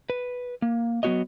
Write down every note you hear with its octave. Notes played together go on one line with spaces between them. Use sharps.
B4
A#3
F#3 B3 D#4 F#4 C#5 D#5